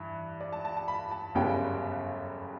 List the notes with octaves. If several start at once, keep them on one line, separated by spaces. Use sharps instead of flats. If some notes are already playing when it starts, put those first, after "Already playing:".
Already playing: G2 E3 E5
D5
A5
A5
A5
B5
A5
G1 F#2 C#3 G3 B3 G5